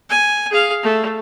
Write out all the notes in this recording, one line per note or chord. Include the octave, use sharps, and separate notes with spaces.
G#5
G#4 F5
A3